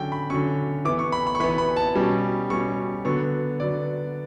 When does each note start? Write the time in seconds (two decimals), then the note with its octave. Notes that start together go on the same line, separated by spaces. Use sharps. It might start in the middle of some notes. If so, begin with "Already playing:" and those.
Already playing: D3 F#3 C#4 G5
0.12 B5
0.30 D3 F#3 C#4 C#6
0.85 E3 D6
0.88 B3
0.99 C#6
1.12 B5
1.27 B5
1.35 C#6
1.40 E3 B5
1.44 B3
1.58 B5
1.76 A5
1.95 B2 G3 C#4
2.50 B2 G3 C#4 C#6
3.05 D3 F#3 B3 C#6
3.60 D3 F#3 B3 D5